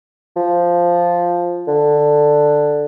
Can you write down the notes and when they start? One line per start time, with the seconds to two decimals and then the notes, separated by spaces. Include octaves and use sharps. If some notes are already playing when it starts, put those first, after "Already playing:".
0.36 F3
1.68 D3